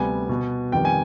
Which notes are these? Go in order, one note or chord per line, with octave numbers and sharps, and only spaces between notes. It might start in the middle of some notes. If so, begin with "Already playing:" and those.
Already playing: D2 C3 G3 B3 G#5
B2 B3
F2 D#3 G3 B3 G5
G#5